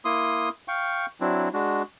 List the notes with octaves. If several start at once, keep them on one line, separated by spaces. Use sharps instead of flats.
A#3 E4 C6 D#6
F5 G5 C#6
F#3 C4 D4 E4
G#3 D4 F#4